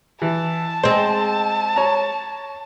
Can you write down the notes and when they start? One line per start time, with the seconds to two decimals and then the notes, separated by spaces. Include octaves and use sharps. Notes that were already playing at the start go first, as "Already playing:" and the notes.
0.22 E3 A5
0.83 G#3 C4 C5
1.76 C#5 A#5